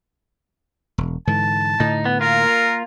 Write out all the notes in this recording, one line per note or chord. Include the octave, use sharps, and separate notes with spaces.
E1
G#2 D3 E3 A5
A2 D3 D#4
B3
A#3 F4 A#4